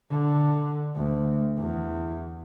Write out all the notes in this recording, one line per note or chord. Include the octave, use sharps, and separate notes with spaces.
D3
D2
E2